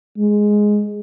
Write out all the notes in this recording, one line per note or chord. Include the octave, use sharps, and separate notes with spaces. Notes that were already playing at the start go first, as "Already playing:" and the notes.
G#3